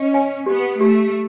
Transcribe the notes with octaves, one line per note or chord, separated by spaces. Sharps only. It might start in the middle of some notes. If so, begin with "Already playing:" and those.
Already playing: C#4 D#5
G#5
B3 G4
A3 G4